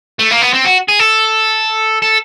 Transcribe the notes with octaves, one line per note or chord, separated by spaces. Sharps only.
A3
A#3
B3
C4
F#4
G#4
A4
A4